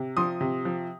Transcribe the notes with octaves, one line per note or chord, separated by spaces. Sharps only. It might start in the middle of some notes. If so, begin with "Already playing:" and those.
Already playing: C3
F3 C6 D#6
C3
F3